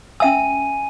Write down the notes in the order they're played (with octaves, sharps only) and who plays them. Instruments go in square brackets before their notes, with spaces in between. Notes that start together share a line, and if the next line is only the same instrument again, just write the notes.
[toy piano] C#4 E5 E6 [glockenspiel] G#5 D#7